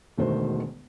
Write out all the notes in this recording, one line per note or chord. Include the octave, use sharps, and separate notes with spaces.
E1 D2 D#3 A3 F#4 C5